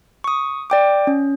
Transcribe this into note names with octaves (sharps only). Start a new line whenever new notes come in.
C#6 D#6
D5 G5 D6
C#4